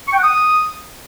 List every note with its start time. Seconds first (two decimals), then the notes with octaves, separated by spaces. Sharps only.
0.08 C#6
0.13 G5
0.18 F#5
0.24 D#6